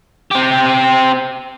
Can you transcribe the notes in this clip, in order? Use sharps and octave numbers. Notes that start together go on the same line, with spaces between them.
C4 G4